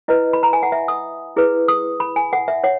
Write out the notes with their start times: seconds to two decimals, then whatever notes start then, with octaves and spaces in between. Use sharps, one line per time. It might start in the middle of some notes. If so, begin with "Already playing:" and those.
0.08 E4 B4 D#5
0.33 B5
0.43 A#5
0.53 G#5
0.63 F#5
0.72 E5
0.88 D#6
1.36 E4 G#4 B4
1.68 D#6
2.00 B5
2.16 G#5
2.33 F#5
2.48 E5
2.64 C#5 F#5